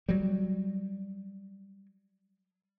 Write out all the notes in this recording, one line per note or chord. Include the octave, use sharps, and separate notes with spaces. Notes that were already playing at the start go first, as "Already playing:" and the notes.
F#3 G3